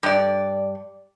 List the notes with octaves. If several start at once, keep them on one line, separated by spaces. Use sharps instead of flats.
G2 D5